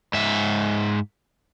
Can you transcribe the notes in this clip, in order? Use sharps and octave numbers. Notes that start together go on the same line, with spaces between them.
G#2 E5